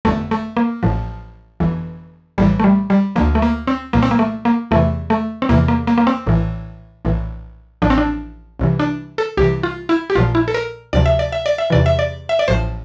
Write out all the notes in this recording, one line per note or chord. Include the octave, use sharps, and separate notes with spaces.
G1 F2 D3 A3
A3
A#3
A1 A2 F3
G1 F2 E3
A#1 A2 E3 G3
A3
G3
G3
D2 D3 F3 A#3
A3
A#3
C4
C2 A#2 F3 A#3
C4
A#3
A3
A#3
E2 C3 E3 A3
A3
C4
E2 C3 E3 A#3
A#3
A#3
A#3
C4
A#1 A2 E3
A#1 A2 E3
A1 A2 F3 D4
C4
D4
C2 C3 E3
D4
A4
C2 C3 E3 G4
F4
E4
G4
A#1 A#2 F3 F4
E4
A4
A#4
D2 C3 F3 D5
E5
D5
E5
D5
E5
E2 C3 E3 D5
E5
D5
E5
D5
A1 A2 F3 C5